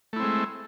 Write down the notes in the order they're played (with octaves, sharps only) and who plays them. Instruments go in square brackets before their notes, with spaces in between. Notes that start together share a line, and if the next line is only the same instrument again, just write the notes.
[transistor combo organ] A3
E4
C4
G#3